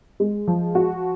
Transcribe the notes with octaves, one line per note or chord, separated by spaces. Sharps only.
G#3
F3
F#4